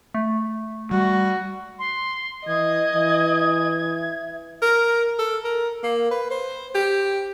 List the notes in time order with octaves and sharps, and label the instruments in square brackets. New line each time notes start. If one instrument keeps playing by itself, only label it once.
[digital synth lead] A3
[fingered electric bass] G3 [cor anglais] F#4
[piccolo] C6
[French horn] E3 [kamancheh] D#5 [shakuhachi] D#6 [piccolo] G#6
[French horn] E3
[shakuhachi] E5
[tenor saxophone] A#4
A4
A#4
A#3
B4
C5
G4